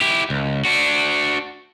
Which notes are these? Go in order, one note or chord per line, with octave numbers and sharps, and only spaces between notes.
E4 G4
C#2
D4 F#4